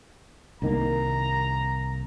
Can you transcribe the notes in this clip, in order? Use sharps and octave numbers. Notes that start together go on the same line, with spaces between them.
C2 D#3 A#3 A#5